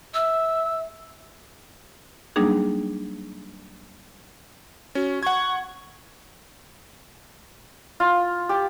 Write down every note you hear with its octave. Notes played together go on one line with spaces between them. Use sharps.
E5 E6
F#3 G3 A#3 D4 D#4 G#4
C#4 F#4
F#5 C#6 G#6
F4
G4